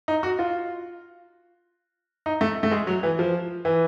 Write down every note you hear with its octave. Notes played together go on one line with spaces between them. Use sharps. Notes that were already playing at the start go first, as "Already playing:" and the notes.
D#4
F#4
F4
D#4
A3
A3
G#3
F#3
E3
F3
E3